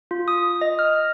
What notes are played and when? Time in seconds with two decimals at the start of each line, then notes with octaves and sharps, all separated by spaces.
0.11 F4
0.28 D#6
0.61 D#5
0.79 F6